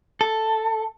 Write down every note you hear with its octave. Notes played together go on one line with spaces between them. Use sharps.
A4